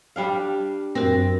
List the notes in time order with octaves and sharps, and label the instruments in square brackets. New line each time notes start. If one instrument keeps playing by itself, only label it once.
[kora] G3 D4 F5
[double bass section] F#2 [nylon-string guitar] C4 [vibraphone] F#4 A#4